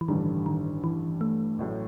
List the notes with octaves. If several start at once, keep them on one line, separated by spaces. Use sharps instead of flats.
E3
A1 G2 D3 D#3 G3
D#3
E3
A3
A1 A2 F#3